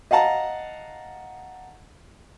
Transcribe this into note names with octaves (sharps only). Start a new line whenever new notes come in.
D#5 F5 F#5 A5 A#5